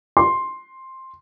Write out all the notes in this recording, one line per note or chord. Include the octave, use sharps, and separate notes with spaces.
C6